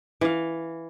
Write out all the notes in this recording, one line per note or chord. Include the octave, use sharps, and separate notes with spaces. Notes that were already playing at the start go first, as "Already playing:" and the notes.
E3 F5